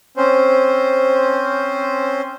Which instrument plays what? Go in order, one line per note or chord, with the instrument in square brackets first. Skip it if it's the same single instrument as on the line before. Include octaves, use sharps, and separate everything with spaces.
[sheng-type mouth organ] C4 C#4 C5